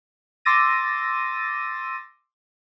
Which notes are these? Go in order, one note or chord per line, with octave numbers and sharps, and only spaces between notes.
C6 D6 E6 A6 A#6 D#7